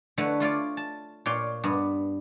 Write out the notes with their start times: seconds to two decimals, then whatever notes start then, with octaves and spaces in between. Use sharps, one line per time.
0.18 D3 A3 E4 B4 C#5 F#5
0.40 A3 F4 C#5 D5
0.77 A5
1.26 A#2 C#5 D5 C6
1.64 G2 B3